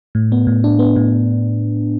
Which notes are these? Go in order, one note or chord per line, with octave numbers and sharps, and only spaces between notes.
A2
B3
A2
D4
B3
A2